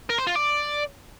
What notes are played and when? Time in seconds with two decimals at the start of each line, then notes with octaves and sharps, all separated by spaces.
0.10 A#4
0.18 C5
0.27 F4
0.36 D5